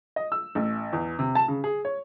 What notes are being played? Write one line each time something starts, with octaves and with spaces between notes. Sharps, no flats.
D#5
E6
A1
E2
C3
A5
C#3
G#4
C#5